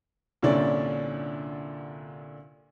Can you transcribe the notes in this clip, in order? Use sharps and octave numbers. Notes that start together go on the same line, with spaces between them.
C2 A#2 D3 C#4 D4 D5